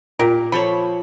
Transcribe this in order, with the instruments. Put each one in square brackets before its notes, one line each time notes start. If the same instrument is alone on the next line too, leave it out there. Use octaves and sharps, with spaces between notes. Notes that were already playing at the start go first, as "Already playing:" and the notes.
[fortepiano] A#2 [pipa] G4 A#4
[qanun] F3 C5 C#5 [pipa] A4 B5